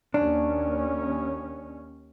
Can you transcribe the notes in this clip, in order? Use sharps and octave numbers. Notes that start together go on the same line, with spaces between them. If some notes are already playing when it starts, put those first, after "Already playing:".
D#2 C#4 D4